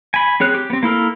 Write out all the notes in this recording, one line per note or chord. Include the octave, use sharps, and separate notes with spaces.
G#5 B5
C4 G#4 C#5 F#6
G4
B3 C4
A#3 E4 A4 A#4